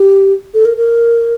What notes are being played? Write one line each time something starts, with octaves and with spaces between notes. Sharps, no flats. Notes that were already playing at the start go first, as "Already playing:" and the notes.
Already playing: G4
A4
A#4
A#4